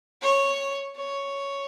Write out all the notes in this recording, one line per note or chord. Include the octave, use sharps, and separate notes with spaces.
C#5
C#5